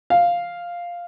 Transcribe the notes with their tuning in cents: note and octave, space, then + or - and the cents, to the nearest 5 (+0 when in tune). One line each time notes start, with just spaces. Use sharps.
F5 +0